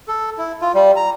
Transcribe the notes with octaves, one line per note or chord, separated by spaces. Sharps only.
A4
E4
F4
G3
A#5